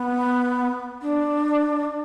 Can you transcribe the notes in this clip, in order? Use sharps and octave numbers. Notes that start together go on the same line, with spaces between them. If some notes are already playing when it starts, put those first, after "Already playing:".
Already playing: B3
D4